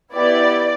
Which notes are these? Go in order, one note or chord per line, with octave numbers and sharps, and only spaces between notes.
B3 E4 G4 D5